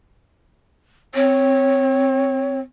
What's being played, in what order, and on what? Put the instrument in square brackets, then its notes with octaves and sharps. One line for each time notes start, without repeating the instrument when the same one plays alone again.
[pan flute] C4 [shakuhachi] C#5